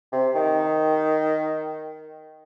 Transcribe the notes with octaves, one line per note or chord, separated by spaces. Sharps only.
C3
D#3